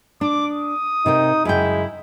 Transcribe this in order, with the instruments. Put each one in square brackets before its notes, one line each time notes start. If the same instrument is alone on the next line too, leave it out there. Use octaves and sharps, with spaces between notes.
[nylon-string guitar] D4 [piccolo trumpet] D6
[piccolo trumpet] D#6
[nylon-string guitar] C3 A#4 G5 [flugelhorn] D#4
[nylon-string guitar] F#2 C#3 G5 [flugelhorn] G#3 [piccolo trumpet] E4